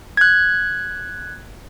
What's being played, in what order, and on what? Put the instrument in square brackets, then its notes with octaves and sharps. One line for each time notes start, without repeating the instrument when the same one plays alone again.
[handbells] F#6 G#6